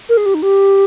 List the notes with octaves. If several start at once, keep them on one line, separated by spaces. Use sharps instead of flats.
A#4
G#4
G4
D#4
G4